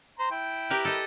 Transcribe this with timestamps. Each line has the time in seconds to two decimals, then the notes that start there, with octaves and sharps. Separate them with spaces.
0.19 C5 A#5 C6
0.31 E4 G5
0.70 G4 A#4 B4
0.85 A4 D#5